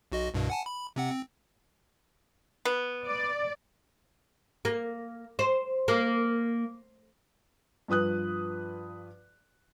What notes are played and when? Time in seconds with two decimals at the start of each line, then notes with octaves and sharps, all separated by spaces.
0.12 B1 F#4 D#5
0.34 C2 G2 B2
0.50 F#5 G#5 A5
0.66 B5
0.96 C3 C4 F#5
1.10 C4
2.65 B3
3.06 D5
4.65 A#3
5.39 C5
5.88 A#3
7.88 G2 F3 B4 D#6 F#6